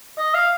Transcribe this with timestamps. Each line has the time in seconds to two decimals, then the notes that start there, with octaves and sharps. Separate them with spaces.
0.18 D#5
0.34 F5